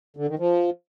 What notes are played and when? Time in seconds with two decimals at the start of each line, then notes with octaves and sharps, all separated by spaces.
0.17 D3
0.28 D#3
0.39 F3